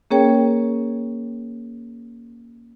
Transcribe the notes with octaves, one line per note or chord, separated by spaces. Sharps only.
A#3 C#4 G#4 A#4 C#5 G5